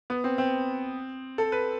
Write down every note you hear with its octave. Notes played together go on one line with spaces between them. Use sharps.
B3
C4
C4
A4
B4